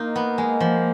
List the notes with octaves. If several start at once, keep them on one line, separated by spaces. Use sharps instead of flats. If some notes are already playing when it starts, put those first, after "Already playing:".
Already playing: A#3 D#4 F4
B3
G#3
F3